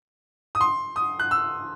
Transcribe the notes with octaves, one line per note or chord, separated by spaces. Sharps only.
D#6
C6
D#6
F#6
E6